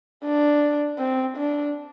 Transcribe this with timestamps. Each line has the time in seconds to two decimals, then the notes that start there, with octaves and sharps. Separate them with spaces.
0.24 D4
0.98 C4
1.36 D4